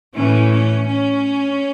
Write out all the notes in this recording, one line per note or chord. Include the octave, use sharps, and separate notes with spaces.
A2 E3 A3 C#4
C#4
C#4